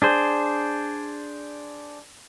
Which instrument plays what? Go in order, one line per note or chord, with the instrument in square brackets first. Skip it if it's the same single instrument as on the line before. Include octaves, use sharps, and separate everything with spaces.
[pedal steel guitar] D4 G#4 C5